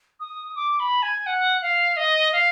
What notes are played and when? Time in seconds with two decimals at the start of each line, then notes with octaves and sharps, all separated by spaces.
0.20 D#6
0.56 D6
0.80 B5
1.02 G#5
1.26 F#5
1.62 F5
1.97 D#5
2.33 F5